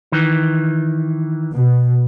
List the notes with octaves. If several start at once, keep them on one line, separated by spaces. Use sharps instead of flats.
D#3 E3
B2